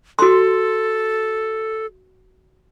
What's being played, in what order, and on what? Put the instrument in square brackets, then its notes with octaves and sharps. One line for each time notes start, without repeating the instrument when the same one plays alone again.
[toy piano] F#4 C6 [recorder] A4